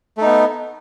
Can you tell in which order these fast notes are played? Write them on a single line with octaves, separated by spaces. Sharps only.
A3 D#4 B3